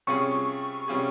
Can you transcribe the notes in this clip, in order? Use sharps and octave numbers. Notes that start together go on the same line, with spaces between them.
C3 G3 C#4 F4 G#4 C#6
C3 G3 C#4 F4 G#4